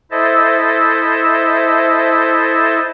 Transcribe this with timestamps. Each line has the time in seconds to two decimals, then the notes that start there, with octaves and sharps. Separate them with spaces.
0.11 E4 A4 C5 D#5 E5 A5